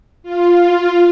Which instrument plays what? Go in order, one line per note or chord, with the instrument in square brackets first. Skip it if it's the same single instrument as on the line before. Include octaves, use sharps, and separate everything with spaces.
[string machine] F4